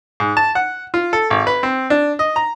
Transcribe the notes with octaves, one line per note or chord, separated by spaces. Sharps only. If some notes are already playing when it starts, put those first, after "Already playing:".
G#2
A5
F#5
F4
A4
G#1
B4
C4
D4
D#5
A#5